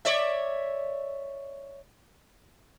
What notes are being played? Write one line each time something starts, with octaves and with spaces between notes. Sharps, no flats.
C#5 D5 E5